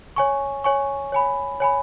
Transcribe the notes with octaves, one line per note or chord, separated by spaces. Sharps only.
C#5 G#5 C#6
C#5 G#5 C#6
C#5 G#5 B5
C#5 G#5 B5